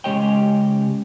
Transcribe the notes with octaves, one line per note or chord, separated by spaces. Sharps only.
C#3 G#3 G4 C#5 D#5 G5